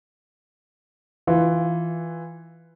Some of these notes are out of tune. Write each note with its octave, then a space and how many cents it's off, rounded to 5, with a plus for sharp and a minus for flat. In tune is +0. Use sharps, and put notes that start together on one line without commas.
E3 +0 F4 +0 B4 +0